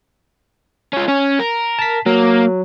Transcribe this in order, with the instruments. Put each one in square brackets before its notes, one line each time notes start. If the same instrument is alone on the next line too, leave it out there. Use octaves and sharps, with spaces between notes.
[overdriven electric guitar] C#4 F4
C#4
A#4
[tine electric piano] A5 B6
[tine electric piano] F#3 [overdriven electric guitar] A#3